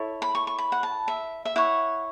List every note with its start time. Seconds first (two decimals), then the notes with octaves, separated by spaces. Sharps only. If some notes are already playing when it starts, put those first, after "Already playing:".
Already playing: E4 A4 C#5
0.22 B5
0.35 C#6
0.47 C#6
0.58 B5
0.72 F#5
0.83 A5
1.08 E5
1.45 E5
1.56 E4 C#5 F#5